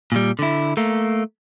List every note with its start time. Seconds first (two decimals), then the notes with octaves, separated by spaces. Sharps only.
0.12 A#2 G3
0.39 D3 E4
0.77 A3 A#3